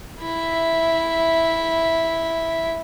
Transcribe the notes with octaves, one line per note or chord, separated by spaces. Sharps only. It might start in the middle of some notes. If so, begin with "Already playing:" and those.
E4 E5